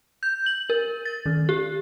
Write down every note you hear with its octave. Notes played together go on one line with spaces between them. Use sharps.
G6
F#7
A#4
A6
D#3
G4